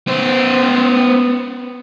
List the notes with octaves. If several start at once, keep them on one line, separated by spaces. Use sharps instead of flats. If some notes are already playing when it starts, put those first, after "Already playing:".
B3 C5